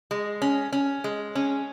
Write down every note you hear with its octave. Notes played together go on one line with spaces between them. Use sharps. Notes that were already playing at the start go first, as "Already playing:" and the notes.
G#3
C#4
C#4
G#3
C#4